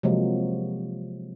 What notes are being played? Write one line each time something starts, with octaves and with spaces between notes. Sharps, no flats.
C3 F3 F#3 G#3 A#3